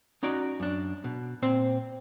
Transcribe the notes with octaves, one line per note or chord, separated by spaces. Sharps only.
C#4 D#4 F#4 D5
F#2 D4
B2
A#2 C4 C5